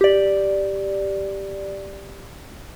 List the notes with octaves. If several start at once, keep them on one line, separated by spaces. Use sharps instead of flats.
G4 D5